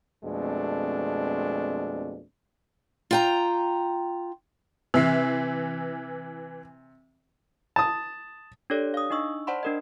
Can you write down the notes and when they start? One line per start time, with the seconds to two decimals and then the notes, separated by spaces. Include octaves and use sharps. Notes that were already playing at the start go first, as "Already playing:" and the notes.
0.24 F2 B2 G#3 A3 C4 D4
3.11 F4 G5 A#5
4.94 C3 E3 E5 C7
7.76 A5 D#6
8.70 D4 G4 A4 C#5 D5
8.94 F5 D#6
9.10 D4 D#4 D#5 C#6 E6
9.47 C5 D5 F#5 A5 B5 C6
9.63 D4 A#4 D#5